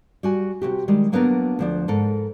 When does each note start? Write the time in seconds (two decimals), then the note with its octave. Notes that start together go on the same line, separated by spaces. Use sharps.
0.23 G3 F#4 G#5
0.62 C3 D#3 F#4 G4
0.88 D#3 G3 G#3
1.12 F#3 A#3 B3 D4 F#4 A#4
1.59 D2 F3 D4
1.88 G#2 A4 A#4